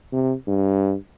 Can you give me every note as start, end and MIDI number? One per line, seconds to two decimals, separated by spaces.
0.13 0.34 48
0.47 0.95 43